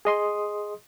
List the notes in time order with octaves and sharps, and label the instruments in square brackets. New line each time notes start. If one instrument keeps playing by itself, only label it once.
[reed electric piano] G#4 D#5 C6 D#6